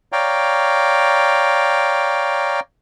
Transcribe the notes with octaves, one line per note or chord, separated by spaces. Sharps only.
C#5 D5 F5 G5 A#5